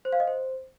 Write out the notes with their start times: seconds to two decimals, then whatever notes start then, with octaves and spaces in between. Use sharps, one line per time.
0.05 C5
0.13 F5
0.20 D#5
0.27 C5